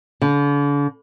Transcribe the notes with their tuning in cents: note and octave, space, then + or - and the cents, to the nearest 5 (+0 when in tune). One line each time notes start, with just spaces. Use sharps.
D3 -40